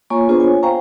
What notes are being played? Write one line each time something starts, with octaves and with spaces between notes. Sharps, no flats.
A#3 F4 C#5 G#5 A#5 C#6
B3 D4 F4 G#4 B4 C5
C#5 G#5
C5 F5 G5 G#5 A#5 C#6